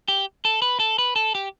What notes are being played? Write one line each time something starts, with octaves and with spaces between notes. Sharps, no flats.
G4
A4
B4
A4
B4
A4
G4